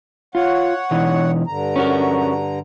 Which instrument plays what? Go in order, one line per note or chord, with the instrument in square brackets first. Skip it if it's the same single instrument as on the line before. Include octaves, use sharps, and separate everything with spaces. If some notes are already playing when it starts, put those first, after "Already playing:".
[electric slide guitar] F4 [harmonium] C#5 F#5
[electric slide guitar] B2 E3 D#4
[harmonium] G2 D3 A#5
[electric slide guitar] C#4 F#4 A#4